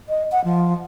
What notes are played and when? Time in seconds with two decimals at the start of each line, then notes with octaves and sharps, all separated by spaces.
0.09 D#5
0.32 F#5
0.44 F3